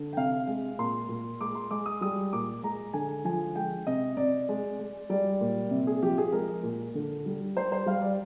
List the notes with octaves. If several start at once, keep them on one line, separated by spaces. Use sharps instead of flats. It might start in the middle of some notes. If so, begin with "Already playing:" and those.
Already playing: D3
G5
C3 F5
G#3
A#2 C6
A#2
G#3 D6
C6
G#3 D6
D#6
G3 D#6
A#2 D6
G#3 A#5
D3 G#5
F3 G#5
G#3 G5
C3 D#5
C3 D5
G#3
G#3
G3 D5
A#2
C3
G#4
F3 G4
G#4
G#3 A#4
A#2
D3
G3
G3 C5
C5
G3 F5
D5